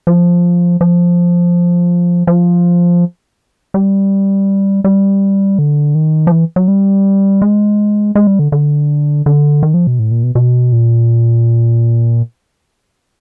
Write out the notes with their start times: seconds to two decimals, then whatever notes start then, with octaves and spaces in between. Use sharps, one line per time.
0.07 F3
0.81 F3
2.27 F3
3.74 G3
4.84 G3
5.59 D3
5.95 D#3
6.27 F3
6.32 E3
6.56 F#3
6.68 G3
7.42 G#3
8.15 G#3
8.27 G3
8.39 D3
8.52 D3
9.26 D3
9.63 D#3
9.74 F3
9.87 B2
9.99 A2
10.11 A#2
10.23 B2
10.35 B2
10.72 A#2